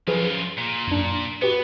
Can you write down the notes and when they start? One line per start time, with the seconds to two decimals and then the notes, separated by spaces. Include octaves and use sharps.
0.08 F#2 F3 F4 G#4 B4
0.58 A#2
0.87 F#2 D4
1.42 B3 F#4 G4 B4